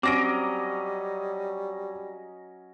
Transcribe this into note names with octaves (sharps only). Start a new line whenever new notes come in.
F#3 G3 C4 C#4 D#5 D6 A#6 D7